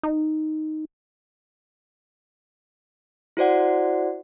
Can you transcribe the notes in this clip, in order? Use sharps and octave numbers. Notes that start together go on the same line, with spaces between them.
D#4
E4 F#4 C5 D5 F#5